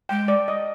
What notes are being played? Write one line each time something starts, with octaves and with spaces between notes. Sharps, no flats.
G#3 G5
D5
D#5